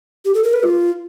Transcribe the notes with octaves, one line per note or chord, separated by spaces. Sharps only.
G4
A4
A#4
B4
F4